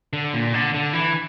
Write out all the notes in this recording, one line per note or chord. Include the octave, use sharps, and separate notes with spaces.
D3
A#2
D3
D3
E3